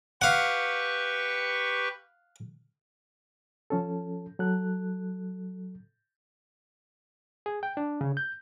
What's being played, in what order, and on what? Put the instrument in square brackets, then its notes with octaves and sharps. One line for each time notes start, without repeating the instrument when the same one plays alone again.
[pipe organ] G4 B4 C#6 [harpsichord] F5 F#5
[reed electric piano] F3 C#4 A4
F#3 A4 F#6
G#4
G5
D4
C#3
G6